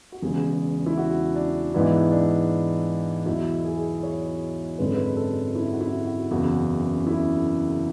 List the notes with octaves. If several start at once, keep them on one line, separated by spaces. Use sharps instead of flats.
F#4
E1 E2 C#3 G#4
E4
F#4
D4
G#2 E3 B3 D4 E4
D4
E2 B2 F#3 E4
G#4
C#5
G#1 F#2 D3 G#3 C#4 B4
A4
B4
A4
E4
F#4
E4
F#4
F#1 E2 C#3 F#4
E4